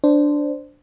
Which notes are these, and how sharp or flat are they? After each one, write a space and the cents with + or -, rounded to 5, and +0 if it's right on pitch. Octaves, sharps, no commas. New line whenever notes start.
D4 +0 C5 -10